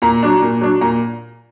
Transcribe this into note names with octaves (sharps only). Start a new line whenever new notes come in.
A#2 A#5
F#3 D4
A#2
F#3 D4
A#2 A#5